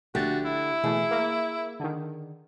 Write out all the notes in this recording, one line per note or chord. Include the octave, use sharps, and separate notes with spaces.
A#1 D3 A3 F#4 G4 A6
E4
B2 E3 A3 G#4
A#3
D3 D#3